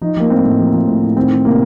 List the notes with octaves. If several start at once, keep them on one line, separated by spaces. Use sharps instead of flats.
F3 D#4
F3 A#3
A2 C4
A2
F3
F3
A2
A2
D#3 C4
D#3
C3 A#3